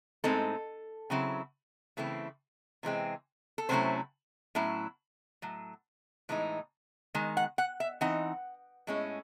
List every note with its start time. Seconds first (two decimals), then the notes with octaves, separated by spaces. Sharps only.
0.24 A2 G#3 C4 D#4 A4
1.10 C#3 F#3 C4 E4
1.97 C#3 E3 A3 C4 E4
2.83 C3 E3 G#3 C4
3.58 A4
3.69 C3 F#3 A3 C#4 E4 C5
4.55 A2 F#3 C#4 E4
5.42 A2 F#3
6.29 A2 E3 G#3 D#4
7.15 D#3 G#3
7.37 F#5
7.58 F#5
7.80 E5
8.01 E3 C4 D#4 F#5
8.87 A2 G#3 C#4 E4